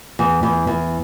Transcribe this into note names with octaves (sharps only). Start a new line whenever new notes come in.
E2
E2
E2